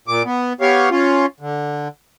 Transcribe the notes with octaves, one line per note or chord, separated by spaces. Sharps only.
A#2 D6
B3
B3 G4 C#5 F5
C#4 F4
D3